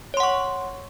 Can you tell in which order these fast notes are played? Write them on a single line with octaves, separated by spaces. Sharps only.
C#5 C6 F#5 C#6